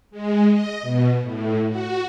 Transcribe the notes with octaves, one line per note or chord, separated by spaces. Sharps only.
G#3
D#5
B2
A2
F#4